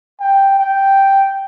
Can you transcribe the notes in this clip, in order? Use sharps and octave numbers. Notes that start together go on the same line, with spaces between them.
G5
G5